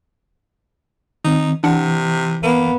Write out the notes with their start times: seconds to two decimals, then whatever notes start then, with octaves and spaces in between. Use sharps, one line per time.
1.25 D#3 C4 D#4
1.64 C3 E3 D4 F#5
2.43 A#3 B3